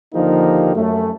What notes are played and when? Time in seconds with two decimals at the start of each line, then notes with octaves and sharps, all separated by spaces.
0.15 D#2 D3 F3 A#3 D#4 G4
0.76 F#2 A3